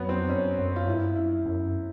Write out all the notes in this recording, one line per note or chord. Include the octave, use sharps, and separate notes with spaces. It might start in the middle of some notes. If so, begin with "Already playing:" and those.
Already playing: F2 F#3 B3
C4
F#2 C#4
F#2
F4
G2 E4
F#2 E4
F#2